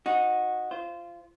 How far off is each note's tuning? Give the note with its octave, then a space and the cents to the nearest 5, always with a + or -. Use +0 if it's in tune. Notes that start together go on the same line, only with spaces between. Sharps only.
D#4 +0 F#4 -15
F4 -20 C5 +0